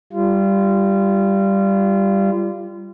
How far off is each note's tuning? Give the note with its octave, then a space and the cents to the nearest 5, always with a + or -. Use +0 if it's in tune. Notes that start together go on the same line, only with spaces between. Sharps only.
G3 +0 F4 -25